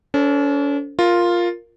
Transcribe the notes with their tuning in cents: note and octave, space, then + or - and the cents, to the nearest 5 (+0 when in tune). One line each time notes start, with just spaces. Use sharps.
C#4 +45 A4 +25 C5 +10
F4 +0 A#4 +0